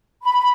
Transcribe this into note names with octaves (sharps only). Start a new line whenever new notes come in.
B5